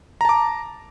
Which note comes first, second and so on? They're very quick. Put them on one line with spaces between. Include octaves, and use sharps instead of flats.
A#5 A5 D6